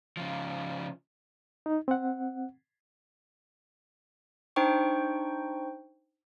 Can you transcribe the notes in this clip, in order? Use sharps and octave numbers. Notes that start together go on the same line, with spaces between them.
C#3 F3
D#4
C4 F#5
D4 D#4 C5 G5 C#6